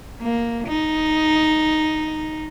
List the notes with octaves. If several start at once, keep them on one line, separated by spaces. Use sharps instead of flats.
A#3
D#4